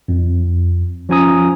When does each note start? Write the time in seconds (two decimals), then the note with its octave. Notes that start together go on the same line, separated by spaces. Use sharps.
0.08 F2
1.09 F3 C#4 F4 G#5 A#5 D#6